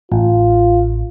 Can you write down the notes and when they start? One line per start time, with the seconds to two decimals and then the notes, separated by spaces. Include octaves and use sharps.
0.12 A1 F4